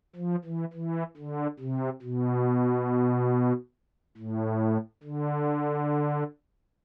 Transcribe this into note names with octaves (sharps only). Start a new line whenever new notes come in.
F3
E3
E3
D3
C3
B2
A2
D3